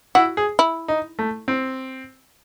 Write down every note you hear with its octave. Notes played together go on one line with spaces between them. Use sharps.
E4 F#4
G#4
E4
D#4
A3
C4